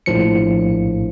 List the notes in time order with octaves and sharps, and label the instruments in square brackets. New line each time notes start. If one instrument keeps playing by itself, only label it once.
[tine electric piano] A#1 A2 F3 C#7